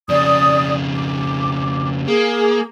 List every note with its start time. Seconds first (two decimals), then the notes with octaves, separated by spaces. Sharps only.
0.09 F2 C#3 D5 D#6
0.95 D6
2.08 A#3 G#4